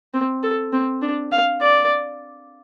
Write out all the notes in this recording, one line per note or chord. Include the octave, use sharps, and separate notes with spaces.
C4
A4
C4
D4
F5
D5